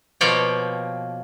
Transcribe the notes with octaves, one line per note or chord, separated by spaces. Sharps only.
B2 F3 A#3 C#5 D5 G5